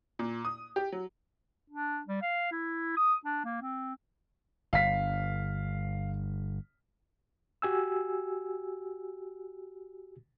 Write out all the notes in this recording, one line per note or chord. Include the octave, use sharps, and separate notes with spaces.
A#2
D#6
G4
F#3
D4
G3
F5
E4
D#6
D4
A#3
C4
G1 F5 B6
F#4 G4 G#5 E6